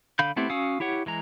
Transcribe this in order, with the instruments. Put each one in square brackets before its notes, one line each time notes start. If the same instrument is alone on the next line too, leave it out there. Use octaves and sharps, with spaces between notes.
[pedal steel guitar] D3 F5 B5 G6
A3 B3 C4 E4 G4
C#4 F#4 F5 D#6 E6
E4 G4 C#5 F#5
E3 G#3 A#5